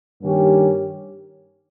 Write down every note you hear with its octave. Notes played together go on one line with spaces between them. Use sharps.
G2 D#3 A#3 C#4 G4